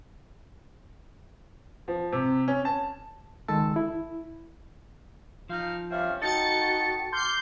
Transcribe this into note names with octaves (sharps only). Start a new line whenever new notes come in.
F3
C3
C#4
A5
C#2 D#3 G#3 A4 A5 E6
E4
F3 D#4 C5 F5
G2 C4 C#4 E5 F5 F6
D#4 F#4 A4 G5 A6 C#7
C6 D6 F6 G6